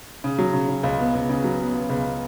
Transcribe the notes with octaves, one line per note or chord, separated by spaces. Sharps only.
C#3
F#3
C#3
C#3
C#2
B3
C#2
C#3
F#3
B3
B3
C#2